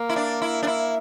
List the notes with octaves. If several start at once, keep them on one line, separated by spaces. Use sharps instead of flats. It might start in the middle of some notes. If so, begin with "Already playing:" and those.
Already playing: A#3
E4
D4
E4
D4
E4